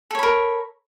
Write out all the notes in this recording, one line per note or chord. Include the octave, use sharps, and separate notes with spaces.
A4 A#4 C#5 B5